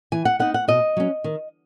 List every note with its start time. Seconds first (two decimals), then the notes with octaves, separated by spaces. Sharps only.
0.12 E3 G#5
0.25 F#5
0.39 B3 D#4 F#5
0.54 F#5
0.68 B2 D#5
0.97 F#3 C#4
1.24 D#3